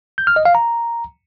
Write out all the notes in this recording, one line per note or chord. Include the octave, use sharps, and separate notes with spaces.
G6
F6
D#5
F5
A#5